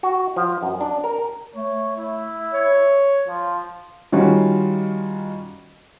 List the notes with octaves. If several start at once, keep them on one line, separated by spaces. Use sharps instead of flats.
F#4
F3
F#2
D4
A#4
A3 C#5
E4
C#5
F3
D#3 G3 C#4 D#4 F4 F#4